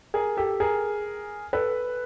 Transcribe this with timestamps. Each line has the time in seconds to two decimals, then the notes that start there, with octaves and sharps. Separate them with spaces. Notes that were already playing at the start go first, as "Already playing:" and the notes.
0.14 G#4 A#4
0.37 G4 A4
0.60 G#4 A#4
1.53 A4 B4